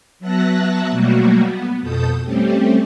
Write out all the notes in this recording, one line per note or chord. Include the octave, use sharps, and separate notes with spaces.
F#3 B3 E5 A5 F#6 A#6
B2 F#3 G3 A3 A#3 F#4
B3
F2 B2 A4 D#6 G6
G3 A3 C4 C#4 G4